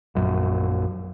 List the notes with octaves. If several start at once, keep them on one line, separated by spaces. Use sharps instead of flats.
A#1 F#2